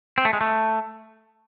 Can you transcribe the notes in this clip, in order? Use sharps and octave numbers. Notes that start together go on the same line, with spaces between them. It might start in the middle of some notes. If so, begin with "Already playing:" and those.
C4
A3
G#3
A3